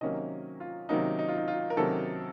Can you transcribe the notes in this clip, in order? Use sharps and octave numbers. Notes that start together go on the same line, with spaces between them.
C3 D#3 F#3 A#3 C#4 D#5
F4
C3 D#3 F#3 A#3 C#4 D#4
D#4
F4
D#4
F4
A#4
C3 D#3 F#3 A#3 C#4 A4